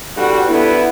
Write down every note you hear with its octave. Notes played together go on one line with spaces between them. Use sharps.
E2 D3 G3 F#4
D3 B3 E4